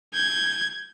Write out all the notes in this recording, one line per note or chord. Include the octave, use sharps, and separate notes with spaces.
G6 G#6